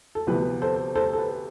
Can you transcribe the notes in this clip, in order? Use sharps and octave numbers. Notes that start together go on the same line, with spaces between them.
A4
D2 C3 F3 B3 B4
A4 C5
A4 C5
A4
B4